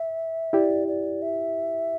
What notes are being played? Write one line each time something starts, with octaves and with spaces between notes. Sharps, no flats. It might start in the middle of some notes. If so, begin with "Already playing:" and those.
Already playing: E5
E4 G4 D5
D5
E5